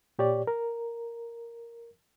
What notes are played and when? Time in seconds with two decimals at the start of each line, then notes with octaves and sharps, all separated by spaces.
0.19 A#2 G4 C#5 D5
0.47 A#4